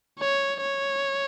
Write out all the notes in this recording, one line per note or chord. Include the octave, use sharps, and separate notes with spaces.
C#5
C#5